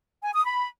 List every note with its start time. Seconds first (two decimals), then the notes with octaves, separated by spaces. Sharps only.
0.23 G#5
0.34 D#6
0.45 B5